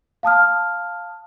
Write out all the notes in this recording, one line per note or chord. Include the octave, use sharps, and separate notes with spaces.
F5 A5 D#6 F6